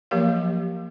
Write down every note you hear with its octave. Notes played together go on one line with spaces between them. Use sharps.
F3 F#3 A#3 G4 A#4 F5